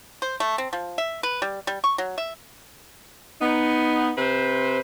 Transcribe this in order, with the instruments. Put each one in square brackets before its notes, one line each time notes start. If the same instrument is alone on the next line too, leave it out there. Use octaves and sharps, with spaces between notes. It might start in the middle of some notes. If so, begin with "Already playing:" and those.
[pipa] C5
A3
C4
F3
E5
B4
G3
G3
C#6
F#3
E5
[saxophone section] B3 D#4
C3 B4 C5